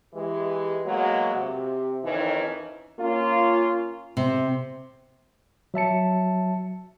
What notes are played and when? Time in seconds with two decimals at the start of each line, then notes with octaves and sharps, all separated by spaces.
0.14 E3 G#3 G4
0.86 F#3 G#3 A#3 B3 F#4
1.35 C3
2.04 F2 D#3 E3 C#4 D#4
3.00 A#3 C#4 F4
4.17 C3
5.74 F#3 E5 A5 C#7